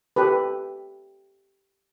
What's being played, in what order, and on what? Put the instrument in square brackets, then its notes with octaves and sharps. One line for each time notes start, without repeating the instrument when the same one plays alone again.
[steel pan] G4 A4 B4